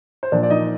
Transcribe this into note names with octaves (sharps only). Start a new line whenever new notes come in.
C5
A#2 F3 D4 D5
D5
D#4 D#5